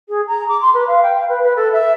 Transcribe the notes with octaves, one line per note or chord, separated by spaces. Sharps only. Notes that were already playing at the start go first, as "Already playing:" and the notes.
G#4
A#5
D6
C6
B4
F5
G5
F5
B4
B4
A4
E5